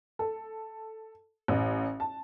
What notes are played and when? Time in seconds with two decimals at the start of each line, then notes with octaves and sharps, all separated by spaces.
0.19 A4
1.48 A1
2.00 A5